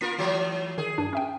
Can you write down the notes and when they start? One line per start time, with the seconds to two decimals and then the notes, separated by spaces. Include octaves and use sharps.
0.01 A#3 F4 A#4 B6
0.18 E3 F#3 A3
0.78 D#3 G#4
0.98 G2 D4
1.13 C#4 E5 G5